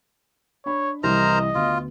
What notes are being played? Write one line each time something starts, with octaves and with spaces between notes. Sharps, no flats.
D4 C#5 B5
C2 E3 G3 A#4 C5 D#5 A#5
D2 B3 F4